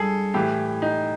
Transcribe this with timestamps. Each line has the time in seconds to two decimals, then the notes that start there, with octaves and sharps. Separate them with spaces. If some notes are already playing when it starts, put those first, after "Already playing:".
Already playing: G2 G#4 A4
0.34 A2 E3 G4
0.82 D#4